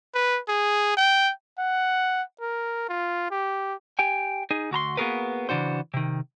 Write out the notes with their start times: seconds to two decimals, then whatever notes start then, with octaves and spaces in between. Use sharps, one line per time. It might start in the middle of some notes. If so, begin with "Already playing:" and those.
0.15 B4
0.49 G#4
0.97 G5
1.59 F#5
2.41 A#4
2.89 F4
3.31 G4
3.99 G4 G5 G#5
4.51 D#4 G#4
4.71 D2 F#4 A#5 C6
4.97 A#3 B3 F#4 G#4 A#4 B4
5.49 C#3 E3 D4 F#4 C5
5.94 C3 D#3